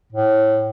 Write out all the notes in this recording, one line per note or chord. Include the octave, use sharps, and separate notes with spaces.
A2